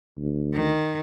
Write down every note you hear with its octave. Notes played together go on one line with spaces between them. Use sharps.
D2
D#3